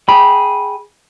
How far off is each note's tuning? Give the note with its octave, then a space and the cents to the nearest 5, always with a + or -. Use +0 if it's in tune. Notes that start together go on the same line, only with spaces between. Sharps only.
G#4 +0 G5 -15 B5 -15